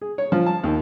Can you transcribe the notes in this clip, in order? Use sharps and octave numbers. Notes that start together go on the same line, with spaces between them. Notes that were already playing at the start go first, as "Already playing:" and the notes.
G#4
C#5
F3
A5
D#2